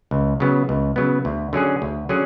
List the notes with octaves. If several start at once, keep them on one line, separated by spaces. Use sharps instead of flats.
C#2
C#3 F#3 B3
C#2
C#3 F#3 B3
D2
D3 F#3 C#4 G#4
D2
D3 F#3 C#4 G#4